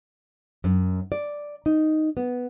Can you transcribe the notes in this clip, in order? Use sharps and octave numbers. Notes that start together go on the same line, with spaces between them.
F#2
D5
D#4
B3